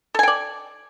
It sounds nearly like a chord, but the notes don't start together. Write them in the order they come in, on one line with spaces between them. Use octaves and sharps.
A4 G#5 G5 D5